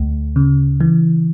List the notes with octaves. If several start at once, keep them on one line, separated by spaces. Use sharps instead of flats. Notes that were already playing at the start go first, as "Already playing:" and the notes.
Already playing: D2 A3
C#3
E3